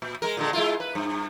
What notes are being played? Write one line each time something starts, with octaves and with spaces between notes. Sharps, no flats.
A#2
G#3 A#4
A#2 D3 G#3
G#3 E4 F4
B4
G2